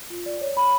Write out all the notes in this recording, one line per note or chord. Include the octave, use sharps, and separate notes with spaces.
F4
D5
C#5
B5